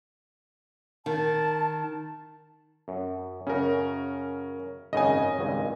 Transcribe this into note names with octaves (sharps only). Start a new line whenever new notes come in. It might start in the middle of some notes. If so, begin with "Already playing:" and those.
D#3 A5
F#2
F#2 C#3 C#4 A#4
G#1 F#2 C#3 D#5 G#5
G#1 C#2 G2